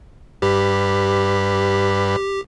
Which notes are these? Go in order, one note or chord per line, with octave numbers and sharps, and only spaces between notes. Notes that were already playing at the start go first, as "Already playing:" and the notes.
G2 G4 B4